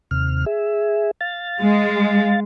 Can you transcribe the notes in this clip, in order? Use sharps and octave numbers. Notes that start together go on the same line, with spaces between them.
D#2 C3 F6
G#4 E5
F5 A6
G#3